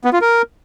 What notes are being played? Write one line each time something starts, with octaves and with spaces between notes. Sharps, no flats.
B3
F4
A#4